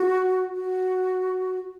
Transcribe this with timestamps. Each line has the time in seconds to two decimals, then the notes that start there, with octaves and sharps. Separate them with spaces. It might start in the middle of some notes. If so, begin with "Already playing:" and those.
Already playing: F#4
0.55 F#4